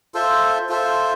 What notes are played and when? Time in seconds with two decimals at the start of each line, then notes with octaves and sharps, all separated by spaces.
0.14 F4 A4 C5 E5
0.69 F4 A4 C5 E5